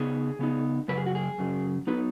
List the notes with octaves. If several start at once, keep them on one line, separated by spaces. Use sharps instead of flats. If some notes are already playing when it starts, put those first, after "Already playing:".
Already playing: C#3 B3 D#4 G#4
C#3 B3 D#4
F#2 C#3 F#3 B4
G#4
F#4
G#4
F#2 C#3 F#3
F#3 B3 D#4 B4